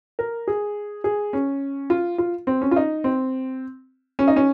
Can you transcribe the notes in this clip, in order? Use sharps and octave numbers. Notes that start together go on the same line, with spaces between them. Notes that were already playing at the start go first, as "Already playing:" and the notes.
A#4
G#4
G#4
C#4
F4
F4
C4
C#4
F4
D#4
C4
C#4
D#4
C#4